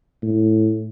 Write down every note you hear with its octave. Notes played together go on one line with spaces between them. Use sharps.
A2